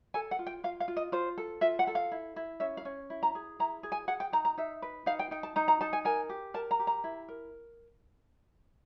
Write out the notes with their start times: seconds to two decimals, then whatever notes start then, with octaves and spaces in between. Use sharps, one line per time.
0.14 A4 G#5
0.31 F#5
0.39 F4
0.47 G5
0.64 F4 F5
0.80 F5
0.88 F4
0.97 D#5
1.12 F4 C5
1.38 A4
1.61 F4 E5
1.79 F#5
1.87 A4
1.95 F5
2.12 E4
2.36 E4
2.60 C#4 E5
2.77 F5
2.85 C#4
3.10 E4
3.23 A#5
3.35 G#4
3.59 E4 A#5
3.83 G#4
3.92 G#5
4.08 G#4 F#5
4.20 G5
4.33 D#4 A#5
4.45 A#5
4.58 D#4 E5
4.82 B4
5.06 D#4 F5
5.19 G5
5.31 D#4 G5
5.43 A5
5.56 D#4 A#5
5.68 A#5
5.81 D#4 A5
5.93 G#5
6.05 A#4 G#5
6.30 G4
6.54 A#4 A5
6.71 A#5
6.79 G4
6.87 A#5
7.04 E4
7.29 A#4